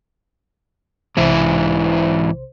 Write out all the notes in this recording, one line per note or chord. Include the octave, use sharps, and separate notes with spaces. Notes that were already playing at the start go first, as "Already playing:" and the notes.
B1 G#2 C3 E3 E4 C5